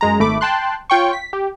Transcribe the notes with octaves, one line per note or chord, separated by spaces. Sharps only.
F#2 G#3 A#5
G#1 A3 B5 D6
G5 A5 C6 F#6
F4 C#5 G5 C6 C#6
B6
G4